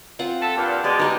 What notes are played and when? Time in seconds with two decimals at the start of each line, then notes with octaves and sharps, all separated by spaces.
0.19 C4 F4 F#5
0.42 A4
0.57 G2 A#2
0.84 B2 G#3 D5
0.99 D#4 G4